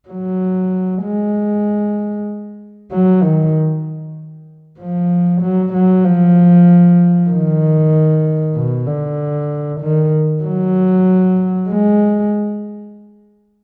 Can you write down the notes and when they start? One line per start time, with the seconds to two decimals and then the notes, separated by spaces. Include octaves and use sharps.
0.09 F#3
1.03 G#3
2.92 F#3
3.23 D#3
4.79 F3
5.42 F#3
5.74 F#3
6.05 F3
7.30 D#3
8.56 B2
8.87 D3
9.81 D#3
10.44 F#3
11.70 G#3